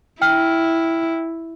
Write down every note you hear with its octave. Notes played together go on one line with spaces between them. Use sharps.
E4 G5 F6